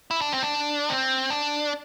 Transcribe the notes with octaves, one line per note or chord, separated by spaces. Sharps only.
E4
D4
C4
D4
C4
D4